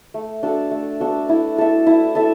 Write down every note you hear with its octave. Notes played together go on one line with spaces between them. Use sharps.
A3
D4 F#4 A4
A3
D4 F#4 A4
E4
A4 E5
E4
A4 E5